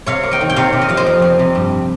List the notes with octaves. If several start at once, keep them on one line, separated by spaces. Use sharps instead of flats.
C3 C#5 F5
A#3
D#5 G5
D#3
G5
C3 C#5 F5
C3
D#5
F3 F5
C5 D#5
F2
F2
C3
G2